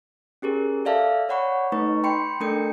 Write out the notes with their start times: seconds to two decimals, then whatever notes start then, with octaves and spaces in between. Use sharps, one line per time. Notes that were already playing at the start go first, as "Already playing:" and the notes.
0.42 C#4 G4 G#4 A#4
0.85 A4 D5 E5 F5 A5
1.29 C#5 D5 F#5 B5 C#6
1.72 A3 D#4 B4 C#6
2.04 G5 B5 C6 C#7
2.41 A3 D4 A4 A#4 G5 C#7